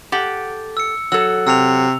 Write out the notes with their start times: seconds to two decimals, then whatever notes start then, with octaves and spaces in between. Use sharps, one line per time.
0.12 G4 A4 F#5
0.77 E6 C#7
1.12 F#3 A4 E6
1.47 C3 E6 F7